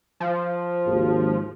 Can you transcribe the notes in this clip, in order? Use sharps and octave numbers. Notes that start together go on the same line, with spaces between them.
F3
G#1 D#2